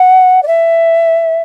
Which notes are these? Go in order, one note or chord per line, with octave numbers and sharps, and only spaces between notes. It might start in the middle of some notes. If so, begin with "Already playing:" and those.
Already playing: F#5
D5
E5